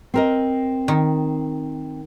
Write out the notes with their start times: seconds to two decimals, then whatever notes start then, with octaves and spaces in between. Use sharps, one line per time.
0.14 C4 A#4 D#5
0.88 D#3